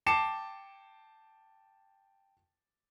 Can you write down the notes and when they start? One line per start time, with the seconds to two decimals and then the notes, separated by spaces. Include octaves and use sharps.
0.06 G5 A5 D6 C7 C#7 E7